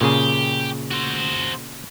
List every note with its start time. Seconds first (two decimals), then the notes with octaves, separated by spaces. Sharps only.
0.01 A#2 C#3 G4 G#4
0.91 F#4 C5